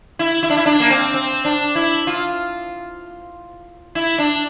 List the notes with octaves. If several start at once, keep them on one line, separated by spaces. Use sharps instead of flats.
E4
E4
D4
E4
D4
A#3
C4
C4
D4
E4
F4
E4
D4